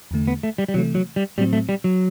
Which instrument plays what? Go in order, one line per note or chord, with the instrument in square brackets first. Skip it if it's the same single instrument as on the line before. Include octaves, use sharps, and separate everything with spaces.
[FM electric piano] E2 D3 A3
[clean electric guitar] B3
A3
G3
G3
[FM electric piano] C3 E3 A3 [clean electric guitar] F#3
[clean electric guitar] F#3
G3
[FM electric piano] A2 F#3 C4 [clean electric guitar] G3
[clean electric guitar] A3
G3
F#3